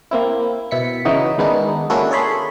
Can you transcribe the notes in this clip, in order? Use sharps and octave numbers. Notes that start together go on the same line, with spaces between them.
A#3 C4 E4
B2 E4 B6 C#7
C#3 E3 D#4 E4 F#4
D#3 G#3 B3 D4 D#4
A#3 C#4 D4 E4 F#4 A4
G#4 A4 C#5 B5 C6